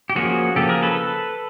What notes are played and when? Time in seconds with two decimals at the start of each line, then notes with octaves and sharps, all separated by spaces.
0.10 G4
0.16 F3 A#3 C#4 F#4 G#4
0.56 C#3 F3 A#3 G4 A4
0.69 G#4 A#4
0.82 A4 B4